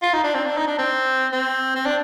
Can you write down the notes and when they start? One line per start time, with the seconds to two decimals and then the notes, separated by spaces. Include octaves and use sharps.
0.02 F4
0.13 D#4
0.24 D4
0.35 C4
0.46 D4
0.57 D#4
0.67 D4
0.78 C4
1.32 C4
1.75 C4
1.85 D4